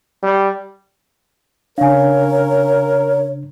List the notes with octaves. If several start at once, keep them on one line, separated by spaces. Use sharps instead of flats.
G3
C#3 D4 A#4 C#5 F5 G#5